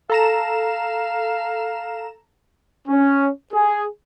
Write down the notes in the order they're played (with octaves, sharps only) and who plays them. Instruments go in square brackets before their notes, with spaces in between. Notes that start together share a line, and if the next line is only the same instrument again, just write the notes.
[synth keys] A4 A#5 E7 [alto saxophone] F5
[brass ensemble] C#4
G#4